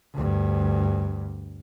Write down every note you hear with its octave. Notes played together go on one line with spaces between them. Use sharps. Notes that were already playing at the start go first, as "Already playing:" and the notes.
D2 G2